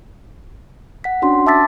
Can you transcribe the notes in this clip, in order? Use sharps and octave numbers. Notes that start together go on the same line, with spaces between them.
F#5 B6
C#4 D4 F#4 C6
E5 A5 D6 E6 A6 B6